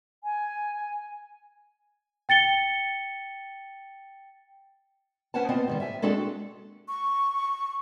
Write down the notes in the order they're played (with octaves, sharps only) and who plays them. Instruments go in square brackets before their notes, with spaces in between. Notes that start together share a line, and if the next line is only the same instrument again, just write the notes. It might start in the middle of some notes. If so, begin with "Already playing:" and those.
[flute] G#5
[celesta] G5 A6 C#7 G7
[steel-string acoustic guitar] C#4 B4 C5 F#5 G#5 A5
B3 C4 F4 C5 D#5 A5
G#2 D#3 G3
E5 G#5
G#3 C4 D4 F#4 G#4 A4
[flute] C#6